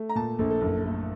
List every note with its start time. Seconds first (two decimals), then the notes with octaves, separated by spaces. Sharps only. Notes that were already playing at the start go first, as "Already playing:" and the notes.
Already playing: A3
0.09 A#5
0.15 A#2 A5
0.39 A#1 A4
0.50 A4
0.61 F#1
0.84 A3